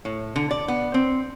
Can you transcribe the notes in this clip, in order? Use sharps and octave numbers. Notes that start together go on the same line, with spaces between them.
A2
D3
D5
B3
C4